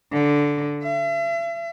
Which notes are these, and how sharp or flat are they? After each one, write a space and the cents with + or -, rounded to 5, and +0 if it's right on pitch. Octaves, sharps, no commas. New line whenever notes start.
D3 -10
E5 +40